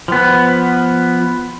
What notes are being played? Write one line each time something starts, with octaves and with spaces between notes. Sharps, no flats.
F3 B3